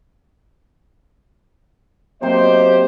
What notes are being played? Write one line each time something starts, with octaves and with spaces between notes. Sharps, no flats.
C3 F#3 A#3 G4 C5 D#5 D6